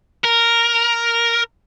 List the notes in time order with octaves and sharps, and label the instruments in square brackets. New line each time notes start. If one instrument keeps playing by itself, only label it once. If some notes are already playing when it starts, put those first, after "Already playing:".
[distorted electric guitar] A#4